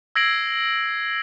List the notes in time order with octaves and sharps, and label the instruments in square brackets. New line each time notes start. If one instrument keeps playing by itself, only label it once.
[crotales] E6 G#6 A#6 C7 D7 F#7